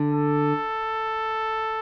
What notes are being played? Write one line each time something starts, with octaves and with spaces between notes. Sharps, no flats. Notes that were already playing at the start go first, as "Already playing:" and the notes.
Already playing: D3
A4